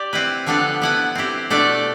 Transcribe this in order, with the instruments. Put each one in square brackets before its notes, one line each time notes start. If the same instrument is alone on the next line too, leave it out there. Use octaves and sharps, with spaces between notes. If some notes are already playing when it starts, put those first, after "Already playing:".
Already playing: [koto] G4 D5
C4 E4 B4
D3 F3 B3 D4 A4
B3 E4 B4
C4 E4 G4
B2 A3 D4 A4 D5